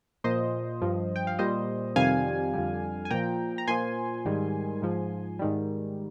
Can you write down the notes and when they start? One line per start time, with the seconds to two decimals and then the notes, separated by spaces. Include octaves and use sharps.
0.24 A#2 F3 C5 D#5
0.81 G2 F3
1.16 G5
1.27 F5
1.39 A#2 G3 C5 D#5
1.96 F2 C3 D#3 G3 F5 G#5
2.54 F2 D3 G3
3.05 G#5
3.11 A#2 F3 G5 A#5
3.58 A#5
3.67 A#2 F3 G#5 C6
4.25 G#2 D#3 G3
4.82 G#2 F3
5.39 G#2 D#3 G3